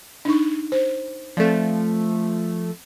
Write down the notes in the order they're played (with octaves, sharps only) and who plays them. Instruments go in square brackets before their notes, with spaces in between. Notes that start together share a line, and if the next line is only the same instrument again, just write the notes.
[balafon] D4 D#4 C#6
C5
[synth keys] F3 A3 [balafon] C4 D5